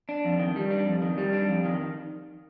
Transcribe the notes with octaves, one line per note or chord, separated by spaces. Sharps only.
D4
F2
D#3
G3
D4
F2
D#3
G3
D4
F2
D#3